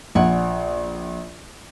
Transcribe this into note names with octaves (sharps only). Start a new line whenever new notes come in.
A#1 D5 F#5 G#5